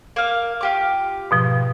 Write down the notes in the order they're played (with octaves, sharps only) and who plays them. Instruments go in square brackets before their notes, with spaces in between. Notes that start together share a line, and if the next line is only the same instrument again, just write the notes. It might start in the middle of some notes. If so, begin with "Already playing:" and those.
[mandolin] A#3 F5
F4 G4 D6
[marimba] G#2 B2 F3